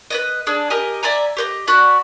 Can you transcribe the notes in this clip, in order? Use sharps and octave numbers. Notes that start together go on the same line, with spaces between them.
B4 D5 D#5
D4 G#4
G4 A#4 D#5 G#5
D5 E5 G#5 A#5
G4 C5 D#5
F#4 D5 B5 F#6